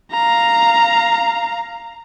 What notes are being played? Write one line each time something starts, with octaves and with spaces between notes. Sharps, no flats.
F5 A#5